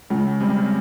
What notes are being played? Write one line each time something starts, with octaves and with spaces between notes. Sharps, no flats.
C#3 G#3
G3 C4